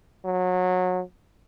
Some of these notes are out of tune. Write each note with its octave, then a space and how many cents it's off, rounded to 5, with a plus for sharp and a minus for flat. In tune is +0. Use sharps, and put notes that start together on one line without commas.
F#3 -25